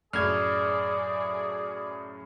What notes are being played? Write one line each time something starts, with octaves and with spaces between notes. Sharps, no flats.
F#2 A2 C#3 G#4 D5 F6 G#6